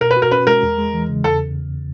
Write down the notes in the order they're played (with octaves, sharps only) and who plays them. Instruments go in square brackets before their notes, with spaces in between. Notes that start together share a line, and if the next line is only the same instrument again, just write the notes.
[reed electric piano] B2 [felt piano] A#4
[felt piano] B4
[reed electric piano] F#4
[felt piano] A#4
[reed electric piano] C#4 [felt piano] B4
[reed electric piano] G#3 [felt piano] A#4
[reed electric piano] E2
G#3
E3
C#3
[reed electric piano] E2 [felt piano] A4